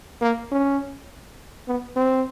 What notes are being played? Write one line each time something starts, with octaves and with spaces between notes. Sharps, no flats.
A#3
C#4
B3
C4